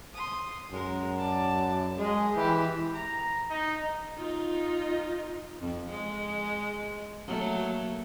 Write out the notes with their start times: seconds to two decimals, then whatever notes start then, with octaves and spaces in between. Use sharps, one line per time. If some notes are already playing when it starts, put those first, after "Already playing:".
0.14 C6 D#6
0.71 F#2 G#3 A#4
1.18 D5 A5
1.98 G#3 G#4 D#5
2.36 E3 E4 G4
2.94 A#5
3.50 D#4
4.18 D#4 F4
5.60 F2
5.91 G#3
7.27 F#3 A3 A#3